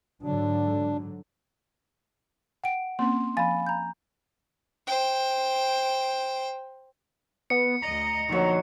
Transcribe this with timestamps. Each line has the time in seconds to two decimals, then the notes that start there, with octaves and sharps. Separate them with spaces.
0.23 G#2 D3 F#3 D4
2.64 F#5 G5 D7
2.99 A#3 C4 C#4 C6
3.37 F3 F5 G#5 B5 A6
3.67 A#5 G6
4.87 C5 G5
7.50 B3 C#7
7.82 D2 D#5 A#5
8.29 A#2 D3 D#3 F3 F#3